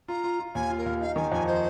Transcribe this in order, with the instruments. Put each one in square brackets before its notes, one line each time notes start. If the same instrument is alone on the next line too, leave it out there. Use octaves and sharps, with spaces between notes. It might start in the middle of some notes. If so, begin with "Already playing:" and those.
[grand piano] F4 [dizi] A#5
[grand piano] F4
F4
[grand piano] D#2 [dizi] G#5
[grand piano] F4
[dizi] A#4
[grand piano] D#2
[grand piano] D#4 [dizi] F5
[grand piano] D#3 [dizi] G#5
[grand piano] F2 [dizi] G#5
[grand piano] D#4 [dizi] C5